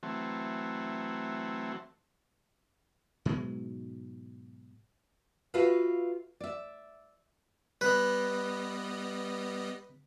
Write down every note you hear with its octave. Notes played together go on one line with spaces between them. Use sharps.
E3 F#3 A3 C4
G#2 B2 F#3 G#3
F4 F#4 A4 B4 E5 F5
D5 E5
G3 B3 B4 D#5